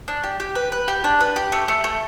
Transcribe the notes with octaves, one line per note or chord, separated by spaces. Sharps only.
D4
G4
G4
B4
B4
G4
D4
B4
G4
A3
A3
A3